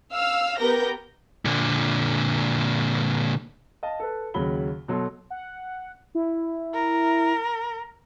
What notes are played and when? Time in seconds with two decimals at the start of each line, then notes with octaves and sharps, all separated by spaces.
0.13 F5 E6 F6
0.58 B3 G4 A#4 G6 A#6
1.45 A#2 D3
3.83 D#5 F5 A5
4.00 A4 B4
4.34 D#2 C#3 F#3 B5 G7
4.88 B2 F#3 A4 C6
5.30 F#5
6.15 E4
6.74 A#4